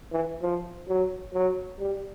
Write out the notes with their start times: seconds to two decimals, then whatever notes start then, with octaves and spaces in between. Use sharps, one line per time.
0.12 E3
0.42 F3
0.88 F#3
1.34 F#3
1.79 G3